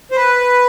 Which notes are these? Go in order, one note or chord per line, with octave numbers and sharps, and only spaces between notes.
C5
B4